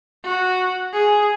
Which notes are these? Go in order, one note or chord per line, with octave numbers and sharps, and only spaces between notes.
F#4
G#4